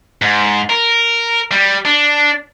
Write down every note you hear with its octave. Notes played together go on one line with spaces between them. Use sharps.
G#2
A#4
G3
D4